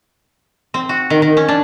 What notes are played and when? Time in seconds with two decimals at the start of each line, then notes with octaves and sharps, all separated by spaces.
0.74 C4
0.89 F#4
1.10 D#3
1.22 D#3
1.37 C#4
1.48 D4